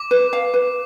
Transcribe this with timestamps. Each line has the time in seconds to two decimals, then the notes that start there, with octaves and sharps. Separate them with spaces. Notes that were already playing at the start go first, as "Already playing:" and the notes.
Already playing: D6
0.11 B4
0.33 F5
0.54 B4